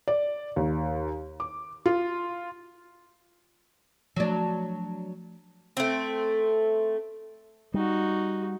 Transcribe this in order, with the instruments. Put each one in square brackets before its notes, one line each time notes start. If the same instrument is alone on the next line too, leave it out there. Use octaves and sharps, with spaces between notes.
[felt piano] D5
D#2
D6
F4
[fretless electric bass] F3 A3 [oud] F#3 D4
[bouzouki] A3 C4
[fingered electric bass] G3 [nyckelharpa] D#4 F#4